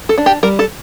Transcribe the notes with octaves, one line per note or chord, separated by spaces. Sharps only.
A4
D4
G4
G3 A#4
A4